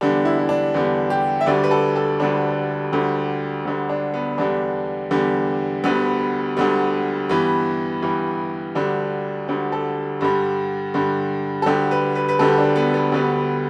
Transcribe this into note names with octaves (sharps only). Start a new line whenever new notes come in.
E2 D3 G3 D4
E4
E4
D4
E2 D3 G3
G4
E5
D2 D3 G3 D5
B4
A4
A4
D2 D3 G3 D4
D2 D3 G3
D2 D3 G3
D4
B3
E2 D3 G3 D4
E2 D3 G3
D2 D3 G3 B3
D2 D3 G3
G2 E3 G3 B3
G2 E3 G3
D2 D3 G3 D4
D2 D3 G3
A4
G2 D3 G3
G2 D3 G3
A4
D2 D3 G3 G4
B4
B4
B4
D2 D3 G3 A4
D4
B3
B3
D2 D3 G3 B3